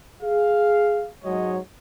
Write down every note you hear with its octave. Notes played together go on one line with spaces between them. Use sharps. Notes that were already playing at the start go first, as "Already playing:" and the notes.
G#4 F5
G#2 F#3 G#3 C#5 D#5